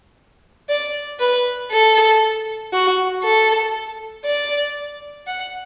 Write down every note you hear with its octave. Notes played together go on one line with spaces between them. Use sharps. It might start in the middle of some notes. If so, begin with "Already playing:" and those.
D5
B4
A4
F#4
A4
D5
F#5